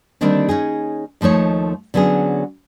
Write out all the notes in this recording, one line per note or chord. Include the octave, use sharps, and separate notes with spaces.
D3 D#3 G3 A#3 C4 D4
C#4 D#4 G#4
D#2 F3 A3 D#4 C#5
D3 F#3 B3 C#4 G#4